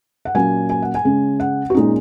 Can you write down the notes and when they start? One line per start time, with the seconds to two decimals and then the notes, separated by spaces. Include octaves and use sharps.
0.25 F#5
0.35 A#2 F#3 A#3 C#4 G#5
0.70 G#5
0.82 F#5
0.95 G#5
1.05 C#3 G#3 C#4
1.40 F#5
1.70 F#4
1.74 A#2 G#3 C#4 D#4